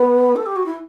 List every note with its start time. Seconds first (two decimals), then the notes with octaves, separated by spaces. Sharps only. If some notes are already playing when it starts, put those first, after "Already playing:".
Already playing: B3
0.36 A4
0.46 G4
0.56 F#4
0.66 E4